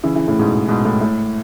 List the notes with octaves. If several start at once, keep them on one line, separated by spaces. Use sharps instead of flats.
C#3 E3
C#3 E3
A2 C#3
G#2 B2
G#2 B2
A2
A2